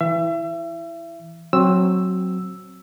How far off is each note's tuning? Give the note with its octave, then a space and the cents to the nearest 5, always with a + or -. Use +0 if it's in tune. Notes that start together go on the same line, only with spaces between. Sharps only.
E3 +0 E5 +35
F#3 +0 C4 +15 E6 +0